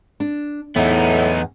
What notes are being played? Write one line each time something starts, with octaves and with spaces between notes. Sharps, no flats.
D4
E2 A2 B3 D#4 F#5